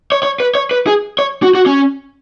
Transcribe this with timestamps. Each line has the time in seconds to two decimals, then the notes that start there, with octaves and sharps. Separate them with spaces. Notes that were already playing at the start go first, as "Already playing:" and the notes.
0.12 C#5
0.23 C#5
0.40 B4
0.55 C#5
0.71 B4
0.87 G#4
1.19 C#5
1.43 F#4
1.55 F#4
1.66 C#4